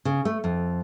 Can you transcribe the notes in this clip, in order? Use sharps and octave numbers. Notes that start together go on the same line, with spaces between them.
C#3
A3
F2